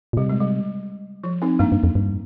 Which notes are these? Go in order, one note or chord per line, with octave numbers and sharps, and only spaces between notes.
A#2
C3 G3
G#3
G3
F3
C4 D#4
G2 A#3 D4
G2
F2
G2